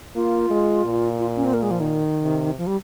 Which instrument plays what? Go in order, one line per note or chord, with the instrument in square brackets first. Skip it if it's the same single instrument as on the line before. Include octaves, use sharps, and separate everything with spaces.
[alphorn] A#3 [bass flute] F4
[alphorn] G#3
A#2
[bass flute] F4
C#4
C4
A#3
G#3
F3
D#3
[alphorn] C3
[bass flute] F3
G3